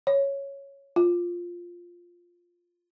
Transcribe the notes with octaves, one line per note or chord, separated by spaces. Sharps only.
C#5
F4